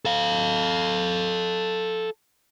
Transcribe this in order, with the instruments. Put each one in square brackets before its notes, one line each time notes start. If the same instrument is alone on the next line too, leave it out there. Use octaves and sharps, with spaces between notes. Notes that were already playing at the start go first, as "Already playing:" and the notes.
[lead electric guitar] A4 F5